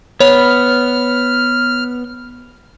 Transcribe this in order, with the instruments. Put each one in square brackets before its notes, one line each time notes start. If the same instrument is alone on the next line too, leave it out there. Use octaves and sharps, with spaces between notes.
[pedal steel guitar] B3 [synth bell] C#5 [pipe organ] F6